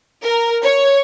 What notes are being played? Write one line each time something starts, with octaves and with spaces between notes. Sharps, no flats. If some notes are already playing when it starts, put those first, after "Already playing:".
A#4
C#5